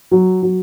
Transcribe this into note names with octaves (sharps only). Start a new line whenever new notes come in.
F#3
F#3